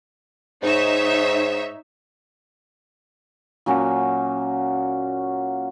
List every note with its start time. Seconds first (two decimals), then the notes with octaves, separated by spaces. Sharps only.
0.63 G#2 D#4 C#5 E5
3.66 A#2 F#3 C#4 F#4